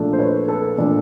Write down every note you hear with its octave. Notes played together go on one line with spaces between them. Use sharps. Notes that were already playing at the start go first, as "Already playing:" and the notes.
Already playing: A#2 F3 A3 D4
C5
B4 C#5
A4 B4
A#2 F3 A3 D4